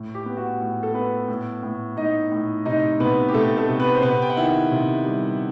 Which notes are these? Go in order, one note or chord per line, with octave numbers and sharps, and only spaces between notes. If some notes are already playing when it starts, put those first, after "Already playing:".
Already playing: A2
G4
B3
F#4
A2
A4
B3 B4
A2
A2
A2 D#4 D#5
A2
C3 D#4 D#5
C3 B3 B4
G4
C3 A3 A4
A3 A4
C3
B3 B4
C5
C3 B3 B4
G5
F#5
D#3 E4 E5
C3
G3